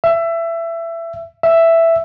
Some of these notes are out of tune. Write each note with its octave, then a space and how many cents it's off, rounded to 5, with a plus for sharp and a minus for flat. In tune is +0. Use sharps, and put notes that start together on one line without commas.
E5 +20
E5 +5